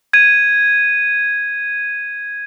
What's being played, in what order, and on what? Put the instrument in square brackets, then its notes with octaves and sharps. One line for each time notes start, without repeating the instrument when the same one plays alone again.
[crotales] G#6 D#7